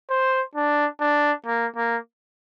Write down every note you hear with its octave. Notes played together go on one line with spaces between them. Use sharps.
C5
D4
D4
A#3
A#3